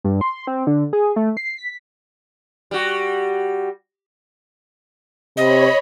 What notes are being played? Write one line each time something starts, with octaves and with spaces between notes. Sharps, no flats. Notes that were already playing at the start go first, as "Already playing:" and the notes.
G2
C6
C4
D3
G#4
A3
C7
B6
G3 F#4
C3 C#5 D#5 B5